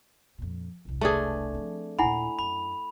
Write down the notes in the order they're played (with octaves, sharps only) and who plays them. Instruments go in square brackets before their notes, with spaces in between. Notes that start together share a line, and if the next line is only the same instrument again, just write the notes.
[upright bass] F2 A#2
E1 C2
[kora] A3 D4 G#4 [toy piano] B4 A5
[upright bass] F3 C4
[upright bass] D#2 A#2 [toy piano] E4 F#5 G#5 [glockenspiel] B5
[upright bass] F#2 [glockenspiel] B5